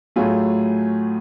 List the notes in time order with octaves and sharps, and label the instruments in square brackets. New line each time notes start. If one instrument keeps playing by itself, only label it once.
[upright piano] A2 F#3 A3 F4 G#4